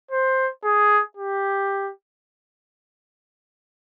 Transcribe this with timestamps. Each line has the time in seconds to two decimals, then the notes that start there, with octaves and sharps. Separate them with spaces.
0.11 C5
0.64 G#4
1.17 G4